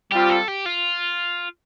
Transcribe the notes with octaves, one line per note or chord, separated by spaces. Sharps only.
G3 C4 F4 G4
A4
G4
F4